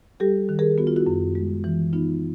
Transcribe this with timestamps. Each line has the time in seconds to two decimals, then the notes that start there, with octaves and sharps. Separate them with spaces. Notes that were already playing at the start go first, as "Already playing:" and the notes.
0.20 G3 G4 A4
0.49 D#3
0.59 G#4 A#4
0.78 B3 F#4
0.87 F4
0.96 E4 F#4
1.07 F#2
1.35 G#3
1.64 E3
1.93 B3 D#4 F4